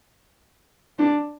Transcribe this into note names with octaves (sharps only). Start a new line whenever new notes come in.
D4